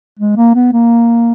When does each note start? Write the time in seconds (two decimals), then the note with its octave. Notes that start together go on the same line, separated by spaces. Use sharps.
0.19 G#3
0.37 A#3
0.55 B3
0.73 A#3